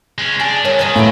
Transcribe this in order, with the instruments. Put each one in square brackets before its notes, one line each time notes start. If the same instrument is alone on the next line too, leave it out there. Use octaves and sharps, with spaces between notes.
[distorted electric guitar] G#3 C#4
[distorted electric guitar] D4 [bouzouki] G#4
[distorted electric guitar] G2 [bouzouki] C#4 G#4 A#4
[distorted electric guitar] D#3 [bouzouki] G#4 C5 D#5
[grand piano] A2 D7 [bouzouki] A#3 B3 E4